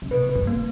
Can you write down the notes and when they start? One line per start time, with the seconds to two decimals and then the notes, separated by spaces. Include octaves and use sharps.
0.02 C#3
0.11 B2 B4
0.29 B4
0.35 G2
0.47 A#3